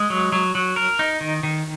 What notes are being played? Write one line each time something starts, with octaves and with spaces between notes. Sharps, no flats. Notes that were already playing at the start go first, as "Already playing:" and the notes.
Already playing: G#3
F#3
F#3
F#3
A#4
D#4
D#3
D#3